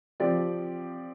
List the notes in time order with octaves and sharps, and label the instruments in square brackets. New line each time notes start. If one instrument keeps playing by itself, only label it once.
[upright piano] F3 C4 G4 D5